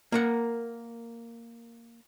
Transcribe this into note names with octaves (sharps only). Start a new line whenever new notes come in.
A#3 A#4 F#5